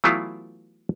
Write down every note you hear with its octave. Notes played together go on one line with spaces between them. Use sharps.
E3 F#3 A3 B3 E4 F4